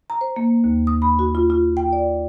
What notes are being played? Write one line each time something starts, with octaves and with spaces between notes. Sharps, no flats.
A#5
C5
A#3
D#2
D#6
B5
F#4
F4
F4
G5
D5